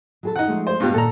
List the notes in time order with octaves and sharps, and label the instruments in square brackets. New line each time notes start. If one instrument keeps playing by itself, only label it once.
[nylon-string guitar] F#3 G#4 A4
[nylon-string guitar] D#3 [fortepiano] D#4 F#5
[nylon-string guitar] F3 G#3 A3
[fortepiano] C5
[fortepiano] G2 B2 [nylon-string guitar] G#3 F4 G4
[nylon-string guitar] A#2 D#3 [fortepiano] A4 A#5